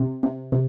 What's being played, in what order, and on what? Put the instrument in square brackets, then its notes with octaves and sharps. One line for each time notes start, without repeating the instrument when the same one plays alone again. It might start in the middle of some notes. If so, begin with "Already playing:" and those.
Already playing: [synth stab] C3
C3
C3